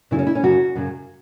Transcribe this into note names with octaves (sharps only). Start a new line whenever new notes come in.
F#2 C#3 F#3 E4
C#4
E4
C#4
F#2 C#3 F#3 F#4
F#2 C#3 F#3